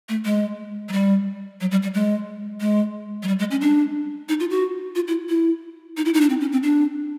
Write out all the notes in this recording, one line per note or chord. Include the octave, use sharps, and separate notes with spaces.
A3
G#3
F#3
G3
F#3
G3
G3
G#3
G#3
F#3
G3
G#3
C#4
D4
D#4
F4
F#4
F4
E4
E4
D#4
E4
D#4
D4
C4
C#4
C4
D4